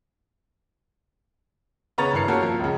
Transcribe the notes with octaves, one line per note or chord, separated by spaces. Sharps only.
C#3 B3 C#5 A#5 A6
G2 E3 A#4 C#5 C7 C#7
A#3 C#4 F#4 G4 A4 A#4
F3 A#3
C#2 C#3